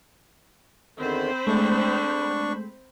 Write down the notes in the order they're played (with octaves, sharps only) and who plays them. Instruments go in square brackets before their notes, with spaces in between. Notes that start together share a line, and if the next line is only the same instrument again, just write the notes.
[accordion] E2 D3 D#3 [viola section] C4 C5 B5
[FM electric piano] G#3 A3 [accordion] D4 C#6